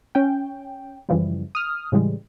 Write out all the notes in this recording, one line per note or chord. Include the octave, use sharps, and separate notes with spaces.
C#4 G5
F#2 C#3 E3 F3 G3
D#6 F6
A2 C#3 E3 G3 G#3